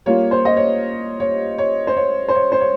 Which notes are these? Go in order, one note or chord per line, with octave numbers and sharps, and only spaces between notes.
G3 A#3 F4 C#5
C5
D#5
C#5
C#5
C#5
C5
C#5
C5
C#5
C5
C#5